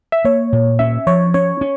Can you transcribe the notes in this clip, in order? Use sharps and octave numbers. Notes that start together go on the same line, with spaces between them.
E5
A#3 C#5
A#2
C#4 E5
F3 C#5
C#4 C#5
C#4